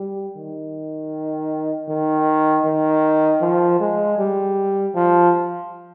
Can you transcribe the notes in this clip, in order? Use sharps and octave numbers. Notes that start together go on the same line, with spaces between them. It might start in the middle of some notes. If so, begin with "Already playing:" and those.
Already playing: G3
D#3
D#3
D#3
F3
G#3
G3
F3